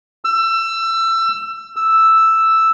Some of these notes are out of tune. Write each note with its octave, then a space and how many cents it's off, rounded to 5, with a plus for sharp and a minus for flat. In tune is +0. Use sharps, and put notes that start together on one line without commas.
E6 +25
E6 +0